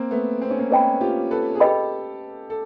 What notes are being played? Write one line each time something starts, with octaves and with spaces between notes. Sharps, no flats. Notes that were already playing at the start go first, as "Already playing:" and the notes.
Already playing: A#3 C4
A3 B3
C4
C#4
A#3 C4
B3 C#4 B4 D#5 G5 B5
F4 G4
A4 B4
G#4
G4 A4 B4 D#5 G5 B5
A4